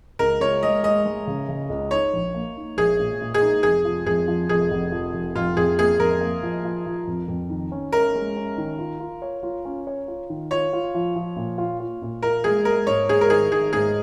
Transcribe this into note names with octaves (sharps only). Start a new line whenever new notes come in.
C#2 A#4
C#2 C#5
G#3 D#5
G#3 D#5
G#3
C#3
C#3
C#2
D#4 C#5
A#1
A#3
D#4
A#1 G#4
A#2
A#2
G#4
D#4
F1 G#4
F3
F2 G#4
F3
F1 G#4
F1
F3
F1
F2 F4
F2 G#4
A#3 G#4
F2 A#4
A#3
F3
F3
F3
F2
F2
D#3
C#4
C#4 A#4
G#3
C#4
D#3
F4
F4
C#5
F4
C#4
C#5
F4
D#3
F4 C#5
F4
F3
F3
A#2
F4
F4
A#2
F4 A#4
G#3 G#4
G#3 A#4
G#2 C#5
G#2 G#4
A#4
D#3 G#4
D#3 G#4
G#2 G#4